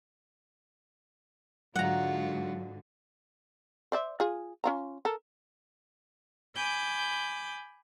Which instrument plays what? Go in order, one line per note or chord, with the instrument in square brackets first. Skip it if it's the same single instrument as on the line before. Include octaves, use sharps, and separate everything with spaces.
[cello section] G#2 D3 [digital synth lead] F#3 [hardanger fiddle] F4 F#4 [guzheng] F#5 A#5
[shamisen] C5 D5 E5
F4 G#4
C#4 F4 A#5
A4 A#4
[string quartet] G#5 B5 D6 G6